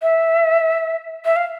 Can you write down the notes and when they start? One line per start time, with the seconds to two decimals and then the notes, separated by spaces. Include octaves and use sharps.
0.02 E5
1.25 E5
1.36 F5